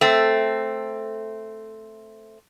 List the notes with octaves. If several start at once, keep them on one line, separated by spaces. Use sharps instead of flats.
A3 C4